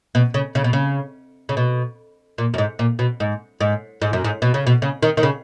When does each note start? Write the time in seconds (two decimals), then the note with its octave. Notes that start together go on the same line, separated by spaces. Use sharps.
0.15 B2
0.34 C#3
0.55 C#3
0.64 B2
0.73 C#3
1.49 C#3
1.57 B2
2.38 A#2
2.54 F#2
2.58 G#2
2.79 A#2
2.99 B2
3.20 G#2
3.61 G#2
4.02 G#2
4.13 F#2
4.24 G#2
4.42 B2
4.54 C#3
4.67 B2
4.82 C#3
5.02 D#3
5.17 D#3
5.23 C#3